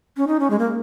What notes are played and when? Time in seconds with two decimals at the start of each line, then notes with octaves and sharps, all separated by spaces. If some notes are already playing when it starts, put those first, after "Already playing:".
0.17 C#4
0.27 D#4
0.40 C#4
0.50 G#3
0.59 A#3